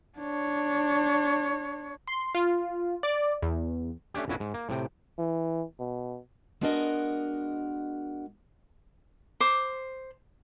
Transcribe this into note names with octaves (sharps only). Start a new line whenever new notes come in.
D4 C#5
C6
F4
D5
E2
A3 C#4 D4 G4
A#1 F2 C#4 E4 F#4 G#4
G#2
A#3
A2 C3 G5
E3
B2
G#3 B3 D4 F#4 A#4 D#5
C5 D6